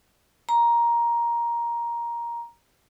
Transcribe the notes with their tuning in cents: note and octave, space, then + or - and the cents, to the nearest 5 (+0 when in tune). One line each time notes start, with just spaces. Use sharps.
A#5 +10